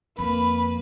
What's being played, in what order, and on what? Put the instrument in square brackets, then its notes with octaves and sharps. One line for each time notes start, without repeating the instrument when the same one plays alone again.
[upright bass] F2 [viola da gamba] A#3 B4 [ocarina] B5